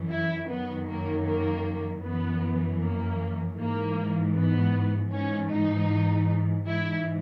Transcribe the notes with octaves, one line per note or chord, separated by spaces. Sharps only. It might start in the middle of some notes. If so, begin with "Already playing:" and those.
Already playing: F#2 E3
E4
F#2 D#3 F#3 B3
A#3
A#3
F#2 E3 B3
A#3
G#2 E3 A#3
B3
G#2 E3 C#4
D#4
G#2 E3 E4